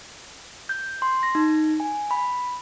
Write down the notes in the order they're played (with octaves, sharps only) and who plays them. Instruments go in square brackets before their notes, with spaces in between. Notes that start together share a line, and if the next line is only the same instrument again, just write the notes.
[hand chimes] G6
C6
A#6
D#4
G#5
B5